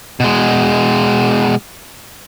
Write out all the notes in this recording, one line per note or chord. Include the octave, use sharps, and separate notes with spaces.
B2 G#3